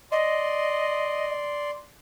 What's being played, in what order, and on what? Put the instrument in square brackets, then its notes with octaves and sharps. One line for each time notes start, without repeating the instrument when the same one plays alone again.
[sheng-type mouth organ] D5 C6 [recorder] D#5